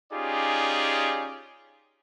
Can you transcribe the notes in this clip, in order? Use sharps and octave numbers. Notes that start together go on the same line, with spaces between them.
C#4 D#4 F4 G4 G#4 D5